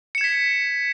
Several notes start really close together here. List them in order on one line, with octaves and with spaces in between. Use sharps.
C#7 E7 G#6 B6